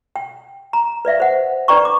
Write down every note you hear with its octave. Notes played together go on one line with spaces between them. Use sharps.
G5
A#5
B4 D5 E5 F5
C5 F#5
D4 B4 D5 G5 A#5 C#6
D6